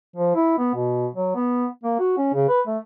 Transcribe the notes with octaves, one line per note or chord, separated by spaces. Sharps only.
F3
E4
B3
B2
F#3
B3
A#3
F#4
C#4
C#3
B4
A3